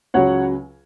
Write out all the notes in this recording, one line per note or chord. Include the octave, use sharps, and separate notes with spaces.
C#2 C#3 F#3 C#5 F#5